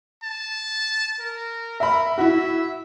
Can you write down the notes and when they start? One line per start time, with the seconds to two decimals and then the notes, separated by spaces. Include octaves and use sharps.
0.23 A5
1.20 A#4
1.80 A#4 E5 B5
2.18 E4 F#4 E5